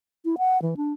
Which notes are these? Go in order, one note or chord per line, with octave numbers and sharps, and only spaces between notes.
E4
F#5
E3
D4